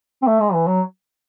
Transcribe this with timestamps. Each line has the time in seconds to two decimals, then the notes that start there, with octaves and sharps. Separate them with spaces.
0.22 C4
0.27 A3
0.40 G#3
0.54 E3
0.67 F#3